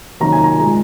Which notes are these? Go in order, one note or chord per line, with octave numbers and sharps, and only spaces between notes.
C3 D#3 F#3 A#3 A#5
G#5
A#5
A#2 G#3